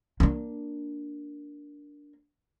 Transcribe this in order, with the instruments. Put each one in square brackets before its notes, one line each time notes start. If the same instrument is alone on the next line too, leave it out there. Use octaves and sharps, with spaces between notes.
[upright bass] A#3 D4